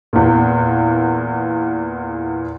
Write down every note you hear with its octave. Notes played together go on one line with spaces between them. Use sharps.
E2 A#2